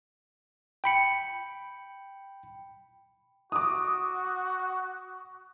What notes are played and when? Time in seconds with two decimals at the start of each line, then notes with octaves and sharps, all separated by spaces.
0.84 G5 B5 C#7
3.52 F#4 D6 D#6